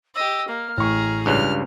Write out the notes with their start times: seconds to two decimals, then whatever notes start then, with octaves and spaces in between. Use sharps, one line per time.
0.15 G4 D#5 E6
0.48 A#3 F6
0.77 A1 G#4 A#5 C#6
1.26 C#2 G2 C#3 F6 F#6